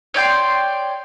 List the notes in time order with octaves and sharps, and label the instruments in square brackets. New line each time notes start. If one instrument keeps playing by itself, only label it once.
[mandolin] C#5 D5 G5 C6